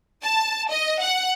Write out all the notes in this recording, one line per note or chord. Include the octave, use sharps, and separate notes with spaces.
A5
D#5
F#5